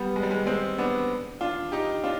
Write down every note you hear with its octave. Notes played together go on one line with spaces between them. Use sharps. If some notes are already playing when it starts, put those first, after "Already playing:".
Already playing: G3 B3
G#3
G3
G#3
G#3 C4
B3 D4
D4 F4
D#4 G4
D4 F4